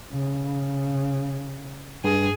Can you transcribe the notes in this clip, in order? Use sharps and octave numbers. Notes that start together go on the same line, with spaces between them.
C#3
G2 G#4